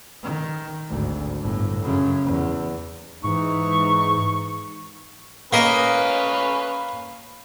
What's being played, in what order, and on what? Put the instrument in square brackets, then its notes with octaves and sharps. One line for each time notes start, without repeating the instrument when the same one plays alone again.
[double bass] D#3
G#1 D2
G1 A2
F#2 C#3
E2
[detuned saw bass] G#2 [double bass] E3 D#4 [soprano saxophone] C#6
[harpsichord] A#3 D#5 [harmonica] C#4 B4